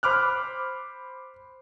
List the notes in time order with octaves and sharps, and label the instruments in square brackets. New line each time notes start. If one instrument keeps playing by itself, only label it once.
[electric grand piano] C5 B5 D6 F6 F#6